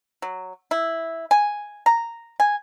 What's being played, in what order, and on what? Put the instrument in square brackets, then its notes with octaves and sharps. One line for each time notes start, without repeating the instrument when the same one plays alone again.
[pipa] F#3
E4
G#5
A#5
G#5